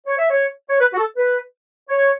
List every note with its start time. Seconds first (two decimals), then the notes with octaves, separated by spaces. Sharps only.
0.07 C#5
0.18 E5
0.30 C#5
0.70 C#5
0.80 B4
0.93 F#4
0.98 A4
1.16 B4
1.89 C#5